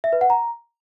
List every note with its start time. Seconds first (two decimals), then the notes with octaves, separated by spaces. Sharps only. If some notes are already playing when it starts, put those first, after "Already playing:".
0.04 E5
0.13 B4
0.21 F#5
0.30 A#5